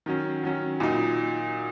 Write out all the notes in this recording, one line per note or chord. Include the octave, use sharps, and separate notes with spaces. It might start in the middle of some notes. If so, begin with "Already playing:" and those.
D#3 F#3 C#4
D#3 F#3 C#4
A#2 F#3 D#4